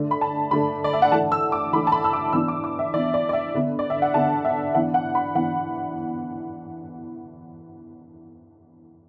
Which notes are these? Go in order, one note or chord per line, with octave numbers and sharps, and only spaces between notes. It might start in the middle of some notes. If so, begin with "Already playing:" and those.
Already playing: D3 A3 D4
B5
A5
D3 A3 D4 B5
D5
E5
F#5
E3 A3 D4 A5
E6
D6
E3 A3 D4 B5
A5
B5
E6
D6
E3 B3 D4 E6
D6
D6
E5
E3 B3 D4 D5
D5
D5
E5
D3 B3 D4
D5
E5
F#5
D3 B3 D4 A5
E5
E3 B3 D4 F#5
F#5
B5
E3 B3 D4 F#5